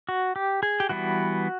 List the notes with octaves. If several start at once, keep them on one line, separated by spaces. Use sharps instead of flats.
F#4
G4
G#4
G4
E3 G3 B3 F#4